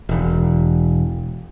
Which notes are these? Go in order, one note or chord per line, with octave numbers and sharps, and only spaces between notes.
E1